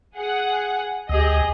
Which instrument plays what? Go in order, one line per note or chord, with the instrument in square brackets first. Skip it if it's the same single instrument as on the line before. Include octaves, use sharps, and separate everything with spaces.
[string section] G#4 F#5
[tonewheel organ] D2 D#6 [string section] G4 G#4 D#5